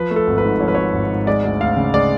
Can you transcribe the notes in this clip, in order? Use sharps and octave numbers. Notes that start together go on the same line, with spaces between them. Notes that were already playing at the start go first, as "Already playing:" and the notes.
Already playing: F3 B4
A3
A4
G#1
B4
G#2
F3 C#5
B4
A3 C#5
G#1
G#2
G#3 D5
D2
D2 F5
C#3
G#3 D5